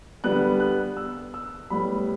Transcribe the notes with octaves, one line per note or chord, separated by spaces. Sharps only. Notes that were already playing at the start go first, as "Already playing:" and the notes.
D3 G3 B3 F#6
F#6
E6
E6
A2 G3 B3 B5